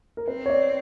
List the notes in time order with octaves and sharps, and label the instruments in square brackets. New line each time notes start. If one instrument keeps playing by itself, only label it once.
[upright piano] A#4
[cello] C4 [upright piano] B4
[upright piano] C#5
D5